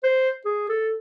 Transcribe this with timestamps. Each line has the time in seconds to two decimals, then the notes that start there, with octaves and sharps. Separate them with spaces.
0.03 C5
0.45 G#4
0.69 A4